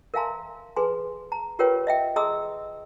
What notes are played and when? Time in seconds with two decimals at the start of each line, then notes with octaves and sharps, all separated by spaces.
0.14 A#4 E5 F5 G#5 A#5 C6
0.76 G#4 B4 G#5 C6
1.32 A#5
1.59 F4 G4 A#4 B4 C#5 G5
1.87 D#5 E5 G5
2.16 G#4 D#5 A#5 C6 D#6 E6